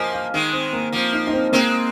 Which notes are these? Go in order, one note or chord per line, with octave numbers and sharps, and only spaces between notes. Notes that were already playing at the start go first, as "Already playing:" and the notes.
Already playing: F3 A#3 A#4 C5 D#5 G#5
F5
D#3 G#3 D#4
C4
A#3
F3 A#3 C4
D#4
D#4
C4
G#3 A#3 C4